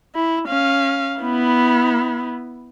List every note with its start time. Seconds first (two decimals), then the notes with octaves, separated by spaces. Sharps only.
0.15 E4
0.48 C#4 F5
1.20 B3 E4